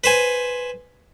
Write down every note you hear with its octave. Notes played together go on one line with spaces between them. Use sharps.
B4 C5 G#5